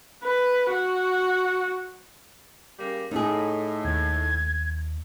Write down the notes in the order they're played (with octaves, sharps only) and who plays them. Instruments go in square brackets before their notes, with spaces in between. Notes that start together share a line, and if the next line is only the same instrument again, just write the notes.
[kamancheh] B4
F#4
[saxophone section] C#3 G3 A#3
[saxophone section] A2 [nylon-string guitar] D#4 G#4
[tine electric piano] D#2 [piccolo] G#6